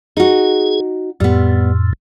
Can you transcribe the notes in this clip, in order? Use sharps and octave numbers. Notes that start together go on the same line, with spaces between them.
D#4 F#4 G#4
F2 A2 G3 B3